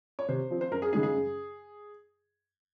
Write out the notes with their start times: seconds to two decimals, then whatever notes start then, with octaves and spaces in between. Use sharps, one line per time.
0.19 C#5
0.29 C3 C5
0.50 F3 C4
0.61 C5
0.71 F#2 A#4
0.82 G#4
0.93 C#3 G#3 D#4 G#4
1.03 G#4
1.14 F#2